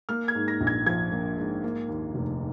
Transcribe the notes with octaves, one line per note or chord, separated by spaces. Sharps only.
A#3 F6
G#6
G#2
A#6
A#1
G#6
F3 G#6
A#3
G#2
A#3
D#2
F1